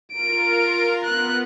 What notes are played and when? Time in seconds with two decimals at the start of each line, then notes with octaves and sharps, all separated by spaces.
0.13 F4 A#4 D7
1.04 B3 F#6